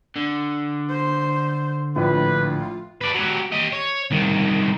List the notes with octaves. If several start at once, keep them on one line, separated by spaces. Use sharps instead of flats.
D3
C5
A#1 A2 F4 B4
B4 D5
F#3 G4
G4 D#5
C#5
C2 D#3